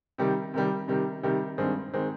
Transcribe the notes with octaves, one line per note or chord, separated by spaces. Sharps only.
C3 D#3 G3
C3 D#3 G3
C3 D#3 G3
C3 D#3 G3
G2 D#3 G#3 C4
D#3 G#3 C4